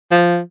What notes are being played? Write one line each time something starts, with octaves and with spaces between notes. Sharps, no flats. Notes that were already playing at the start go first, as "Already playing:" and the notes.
F3